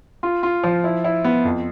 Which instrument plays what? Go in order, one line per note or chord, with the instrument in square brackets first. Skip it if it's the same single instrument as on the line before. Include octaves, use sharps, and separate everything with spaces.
[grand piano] F4
F4
F3
E4
E4
B3
F2